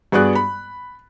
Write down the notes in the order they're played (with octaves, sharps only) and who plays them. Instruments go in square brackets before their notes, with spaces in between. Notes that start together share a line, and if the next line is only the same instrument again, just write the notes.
[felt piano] G2 B3 F#4 G#4 D5 F#6
B5